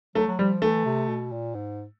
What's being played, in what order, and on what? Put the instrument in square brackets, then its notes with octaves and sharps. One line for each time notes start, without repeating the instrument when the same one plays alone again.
[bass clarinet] F#3 [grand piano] A3
[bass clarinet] F#3
[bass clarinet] F3 [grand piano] G3
[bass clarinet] E3 [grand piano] A3
[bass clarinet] C3
B2
A#2
G#2